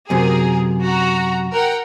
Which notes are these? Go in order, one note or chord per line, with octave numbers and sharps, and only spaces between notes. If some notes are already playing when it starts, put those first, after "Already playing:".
F#2 C3 G#4 A#4
F#4 A#5
A#4 F#5 G5